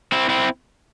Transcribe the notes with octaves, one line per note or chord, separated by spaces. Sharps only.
C4 E4
C4 E4